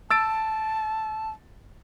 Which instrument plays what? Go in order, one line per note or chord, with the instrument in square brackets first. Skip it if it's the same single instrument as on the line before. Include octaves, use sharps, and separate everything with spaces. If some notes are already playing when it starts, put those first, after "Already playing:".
[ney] A5 [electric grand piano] E6 A6 D7